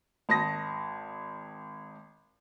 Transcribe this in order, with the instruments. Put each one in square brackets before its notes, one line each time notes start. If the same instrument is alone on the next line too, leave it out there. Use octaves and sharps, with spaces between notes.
[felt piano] G#1 A5 D#6 A#6